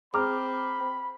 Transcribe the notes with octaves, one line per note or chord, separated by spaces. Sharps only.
C4 G#4 A#5 B5 D6 F6